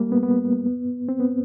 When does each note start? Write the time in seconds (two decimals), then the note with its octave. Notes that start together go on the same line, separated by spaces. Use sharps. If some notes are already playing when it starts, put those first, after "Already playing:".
Already playing: G3 A#3
0.12 B3
0.23 B3
1.09 C4
1.20 B3